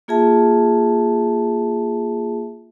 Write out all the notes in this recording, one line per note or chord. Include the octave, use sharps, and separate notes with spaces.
A#3 F4 G#4 E5 A5